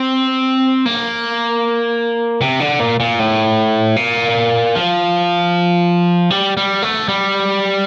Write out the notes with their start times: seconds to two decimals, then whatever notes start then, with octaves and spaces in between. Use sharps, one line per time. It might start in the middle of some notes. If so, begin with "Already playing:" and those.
Already playing: C4
0.86 A#3
2.42 C3
2.60 D3
2.80 A#2
3.00 A#2
3.19 A2
3.96 A#2
4.76 F3
6.30 G3
6.57 G3
6.82 A3
7.08 G3